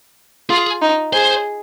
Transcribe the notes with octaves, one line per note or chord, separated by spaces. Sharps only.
F4 G#4
D#4
G#4 C5